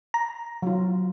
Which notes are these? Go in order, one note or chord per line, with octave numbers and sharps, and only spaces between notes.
A#5
F#3 F4